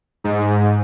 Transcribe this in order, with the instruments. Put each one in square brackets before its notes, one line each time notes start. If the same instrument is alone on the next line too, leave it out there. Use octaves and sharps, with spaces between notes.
[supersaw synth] G#2